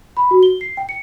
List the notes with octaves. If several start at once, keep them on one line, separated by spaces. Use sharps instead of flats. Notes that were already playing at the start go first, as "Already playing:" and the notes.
B5
F#4
G7
C7
G5
C#7